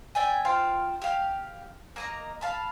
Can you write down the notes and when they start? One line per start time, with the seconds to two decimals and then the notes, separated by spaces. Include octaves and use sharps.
0.15 D5 E5 G5 G#5
0.45 F4 C5 F5 G5
1.02 G4 F5
1.96 A#3 D#5 A#5
2.41 F5 A5 B5